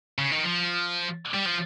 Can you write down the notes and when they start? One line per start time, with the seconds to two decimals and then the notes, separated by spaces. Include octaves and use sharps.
0.18 C#3
0.31 D#3
0.44 F3
1.34 G3
1.46 F3